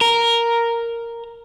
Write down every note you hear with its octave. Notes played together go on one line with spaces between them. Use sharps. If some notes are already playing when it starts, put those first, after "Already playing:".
A#4